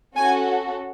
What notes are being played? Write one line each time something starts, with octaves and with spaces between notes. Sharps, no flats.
C#4 F#4 A4 G#5